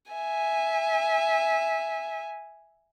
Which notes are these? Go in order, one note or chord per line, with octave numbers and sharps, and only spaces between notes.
E5 G#5